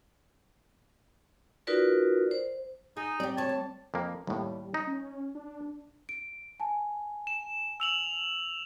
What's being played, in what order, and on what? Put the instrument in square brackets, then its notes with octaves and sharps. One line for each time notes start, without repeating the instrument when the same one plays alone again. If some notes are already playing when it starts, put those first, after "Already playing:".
[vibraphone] D#4 F4 F#4 A#4 B4 D5
C5
[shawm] D#4 [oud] G#4
[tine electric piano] G3 C4 [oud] G4 D5
[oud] D2 C#5 [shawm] A5
[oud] D2
[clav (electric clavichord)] F2 A#3
[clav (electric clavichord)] D#2 A2 [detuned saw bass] G3
[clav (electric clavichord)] D#4
[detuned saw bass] C#4
D4
[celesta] D7
G#5 A5
[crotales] E7
E6 F7 F#7